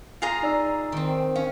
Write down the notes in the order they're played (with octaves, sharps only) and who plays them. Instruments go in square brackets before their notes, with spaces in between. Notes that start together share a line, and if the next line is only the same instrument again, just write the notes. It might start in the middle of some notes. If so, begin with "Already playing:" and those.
[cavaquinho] F4 G#4 A#5
[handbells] D#4 D5 E6
[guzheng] D#3 C4
[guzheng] C#4 [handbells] F5